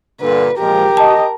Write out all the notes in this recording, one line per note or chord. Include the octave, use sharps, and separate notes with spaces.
G2 A#2 D3 B4
A#2 F3 G#3 G4 A#4
D#5 A5